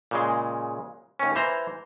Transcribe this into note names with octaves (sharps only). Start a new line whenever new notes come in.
A#2 C#3 G#3
D#2 C#4
E3 C5 A#5